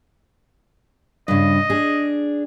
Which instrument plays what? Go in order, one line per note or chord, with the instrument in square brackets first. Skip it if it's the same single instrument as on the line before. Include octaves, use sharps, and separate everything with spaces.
[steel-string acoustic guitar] G2 C#3 [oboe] D#5
[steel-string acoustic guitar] D4 G#4